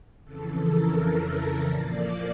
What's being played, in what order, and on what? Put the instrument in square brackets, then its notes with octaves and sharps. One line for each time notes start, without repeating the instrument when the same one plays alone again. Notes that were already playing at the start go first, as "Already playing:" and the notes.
[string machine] F2 C#3 E3 A4
A#4
A4
A#2 F3 A#3 D5